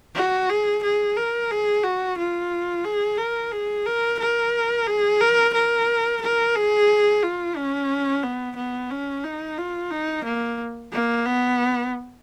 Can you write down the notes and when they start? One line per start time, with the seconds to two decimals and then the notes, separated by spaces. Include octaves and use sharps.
0.16 F#4
0.50 G#4
0.84 G#4
1.17 A#4
1.51 G#4
1.84 F#4
2.18 F4
2.85 G#4
3.18 A#4
3.52 G#4
3.86 A#4
4.20 A#4
4.87 G#4
5.21 A#4
5.54 A#4
6.22 A#4
6.55 G#4
7.23 F4
7.57 C#4
8.23 B3
8.57 B3
8.91 C#4
9.24 D#4
9.58 F4
9.91 D#4
10.25 A#3
10.93 A#3
11.26 B3